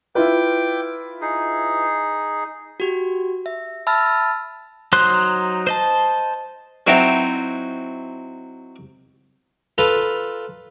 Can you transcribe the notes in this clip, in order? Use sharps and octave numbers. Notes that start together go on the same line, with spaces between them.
E4 F4 B4 G5 D6
D#4 G#4
F#4 G4
E5
E5 A5 B5 E6 F6 A6
F#3 D#4 C5 C6 F#6
C5 D#5 A5
F#3 C4 D#4 E4
F4 A4 B4 A#5